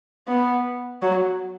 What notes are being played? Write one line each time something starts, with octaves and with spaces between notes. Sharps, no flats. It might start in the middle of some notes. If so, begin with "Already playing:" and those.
B3
F#3